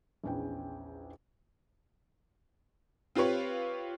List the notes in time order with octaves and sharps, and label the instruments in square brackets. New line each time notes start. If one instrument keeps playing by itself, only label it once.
[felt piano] A#1 E2 C#4 B4 G5
[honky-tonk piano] C4 F4 G4 B4 C#5